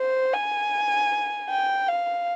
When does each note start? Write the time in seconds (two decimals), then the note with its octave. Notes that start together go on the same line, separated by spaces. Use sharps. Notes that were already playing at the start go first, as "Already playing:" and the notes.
Already playing: C5
0.33 G#5
1.50 G5
1.88 F5